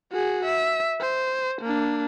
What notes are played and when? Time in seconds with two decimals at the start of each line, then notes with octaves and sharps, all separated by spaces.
0.12 F#4 G#4
0.45 E5
1.01 C5
1.62 A#3 D4